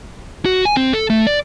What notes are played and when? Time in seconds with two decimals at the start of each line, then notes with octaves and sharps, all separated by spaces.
0.45 F#4
0.65 G#5
0.77 C4
0.93 A4
1.10 A3
1.27 D5